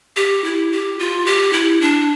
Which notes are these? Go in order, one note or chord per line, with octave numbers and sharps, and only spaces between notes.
G4
E4
G4
F4
G4
E4
D4